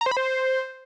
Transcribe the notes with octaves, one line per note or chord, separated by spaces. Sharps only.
A#5
C5
B5
C5